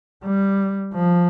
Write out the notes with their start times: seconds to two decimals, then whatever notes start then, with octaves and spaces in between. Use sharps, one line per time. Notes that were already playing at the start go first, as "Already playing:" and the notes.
0.25 G3
0.95 F3